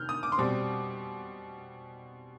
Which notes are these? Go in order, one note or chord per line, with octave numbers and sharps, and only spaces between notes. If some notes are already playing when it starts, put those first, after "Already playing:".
Already playing: C3 D#3 F6 G6
D#6
D6
C6
B2 G3 C4 D6